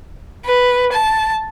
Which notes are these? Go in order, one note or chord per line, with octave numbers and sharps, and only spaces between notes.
B4
A5